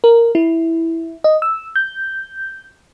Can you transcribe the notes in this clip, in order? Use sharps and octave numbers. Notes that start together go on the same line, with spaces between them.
A#4
E4
D#5
E6
G6